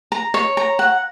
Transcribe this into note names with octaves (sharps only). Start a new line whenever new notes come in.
A#5
C#5
A#5
F#5